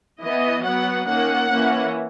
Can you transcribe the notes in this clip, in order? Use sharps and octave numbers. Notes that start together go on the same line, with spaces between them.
E3 B3 D#5
F#3 B3 F#5
D#3 A#3 C#4 F#5
E3 A#3 C#4